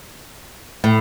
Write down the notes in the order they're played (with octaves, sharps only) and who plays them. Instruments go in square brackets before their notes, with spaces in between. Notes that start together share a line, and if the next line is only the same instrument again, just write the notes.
[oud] A2